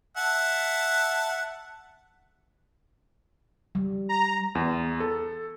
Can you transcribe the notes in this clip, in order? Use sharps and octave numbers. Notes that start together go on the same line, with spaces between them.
E5 F#5 A5
G3
A#5
E2
A4